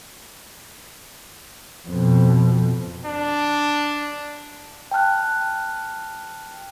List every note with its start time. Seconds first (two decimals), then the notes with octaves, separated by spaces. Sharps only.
1.88 F2 B2
3.06 D4
4.91 G5 A5 F6 F#6